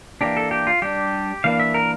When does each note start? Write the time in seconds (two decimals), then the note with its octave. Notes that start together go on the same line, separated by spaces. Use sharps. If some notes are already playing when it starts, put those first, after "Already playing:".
0.21 E3 A#3 D4 G4
0.37 A4
0.51 G4
0.67 F4
0.82 G3 D4 G4
1.44 E3 A#3 D4 F5
1.60 E5
1.74 A#4